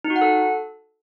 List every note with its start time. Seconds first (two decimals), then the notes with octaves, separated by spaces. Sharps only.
0.04 D#4
0.10 F#4
0.16 F#5
0.21 A4